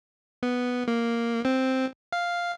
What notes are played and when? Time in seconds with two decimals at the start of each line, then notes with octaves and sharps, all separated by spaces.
0.43 B3
0.88 A#3
1.45 C4
2.12 F5